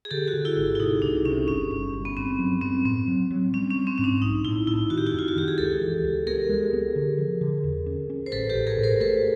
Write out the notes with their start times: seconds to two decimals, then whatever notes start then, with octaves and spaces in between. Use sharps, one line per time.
0.05 G#4
0.11 D3 G4 A4
0.27 F#4 G#4
0.33 D3
0.45 E4 F#4
0.57 G#1
0.75 E4
0.79 C3 D#4
1.02 C2 D4
1.25 C3 C#4
1.47 G1 C#4
1.70 G1
1.93 G1
2.05 B3
2.17 G2 C4
2.39 F#3
2.61 G2 C4
2.85 A2 C4
3.08 F#3
3.30 F#3
3.53 G3 C#4
3.71 C#4
3.76 G3
3.87 C4
3.98 G#2 C#4
4.04 D4
4.22 B1 D#4
4.45 A2 E4
4.67 A2 E4
4.90 D#3 F#4
4.97 G4
5.07 E4 F#4
5.13 F#2
5.19 F4
5.28 F#4
5.36 D#3 G4
5.48 G#4
5.58 C#2 G4 A4
5.81 E3
6.04 C#2
6.27 B3 G#4 A#4
6.49 G#3
6.73 B3
6.96 D3
7.18 F3
7.41 D3
7.64 E2
7.86 C#4
8.10 C#4
8.26 C5
8.32 A1 A4 B4
8.49 G4 A4
8.55 A1
8.67 G#4 A#4
8.78 A2
8.84 A#4 C5
9.00 A3 A4 B4